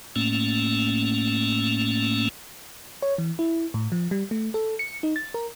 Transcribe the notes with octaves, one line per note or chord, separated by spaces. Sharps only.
A2 A3 A#3 C#4
C#5
E3
E4
A2
F3
G3
A3
A4
C#7
D#4
A6
A#4